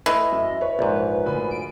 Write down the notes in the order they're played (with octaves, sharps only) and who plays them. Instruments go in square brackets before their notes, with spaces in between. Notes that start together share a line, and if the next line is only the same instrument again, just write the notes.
[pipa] E3 [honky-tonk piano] A3 [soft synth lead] D#5
[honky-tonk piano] F#2 E5
[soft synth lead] B4 [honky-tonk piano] C#5
[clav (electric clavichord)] A#1 G#2
[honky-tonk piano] D2 B5
[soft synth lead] D7